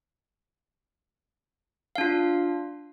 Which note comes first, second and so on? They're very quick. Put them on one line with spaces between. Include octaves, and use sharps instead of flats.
F5 D4 F4